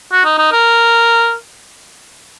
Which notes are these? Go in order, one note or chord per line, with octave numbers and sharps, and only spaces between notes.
F#4
D#4
D#4
A#4